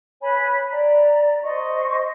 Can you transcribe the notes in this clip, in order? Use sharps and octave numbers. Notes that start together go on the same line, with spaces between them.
B4 C#5 G#5 B5
D5 A#5
C5 D#5 C#6